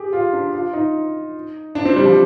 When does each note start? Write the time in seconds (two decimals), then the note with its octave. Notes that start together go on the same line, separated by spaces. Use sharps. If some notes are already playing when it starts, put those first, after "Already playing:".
Already playing: G4 G#4
0.13 F4
0.33 D4
0.53 F4
0.73 D#4
1.75 D4
1.85 C4
1.96 G3
2.05 F3